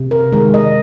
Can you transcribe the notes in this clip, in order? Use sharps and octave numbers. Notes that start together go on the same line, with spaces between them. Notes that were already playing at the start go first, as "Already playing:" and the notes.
Already playing: C3
A#4
D#3 G#3 A#4
D#5